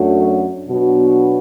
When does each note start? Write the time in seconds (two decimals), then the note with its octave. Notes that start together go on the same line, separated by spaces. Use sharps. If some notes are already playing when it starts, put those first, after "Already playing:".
Already playing: F#2 F#3 A3 D4 F#4
0.67 B2 F#3 B3 D4 F#4